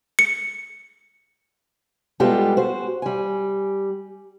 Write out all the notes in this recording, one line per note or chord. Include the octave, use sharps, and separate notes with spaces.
C#7
G3 G#3 B3 F4 G4 A4
F#4 C5
G3 G#5